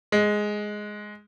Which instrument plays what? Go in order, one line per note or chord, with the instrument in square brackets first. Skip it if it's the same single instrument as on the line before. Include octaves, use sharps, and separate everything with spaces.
[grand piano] G#3